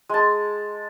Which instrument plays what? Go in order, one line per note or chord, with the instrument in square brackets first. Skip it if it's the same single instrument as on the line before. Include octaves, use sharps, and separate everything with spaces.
[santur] G#3 A5